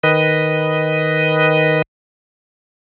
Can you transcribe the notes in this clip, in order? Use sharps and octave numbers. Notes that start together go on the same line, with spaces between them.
D#3 B4 D#5